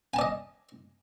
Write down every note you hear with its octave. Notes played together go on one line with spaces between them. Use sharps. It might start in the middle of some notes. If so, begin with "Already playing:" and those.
D5 D#5 G#5 A5